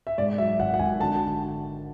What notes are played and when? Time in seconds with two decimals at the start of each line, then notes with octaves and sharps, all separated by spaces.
0.07 E5
0.18 G#2 D5
0.38 F#3 E5
0.59 G#1 F#5
0.74 F#5
0.79 G#1 G#5
1.00 D3 A5